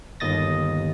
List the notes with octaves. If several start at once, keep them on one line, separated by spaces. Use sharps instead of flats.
G1 D#2 D#5 D#6 A6 A#6